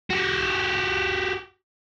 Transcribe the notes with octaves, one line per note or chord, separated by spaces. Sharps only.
F#4 G4